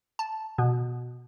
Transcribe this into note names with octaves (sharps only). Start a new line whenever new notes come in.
A5
B2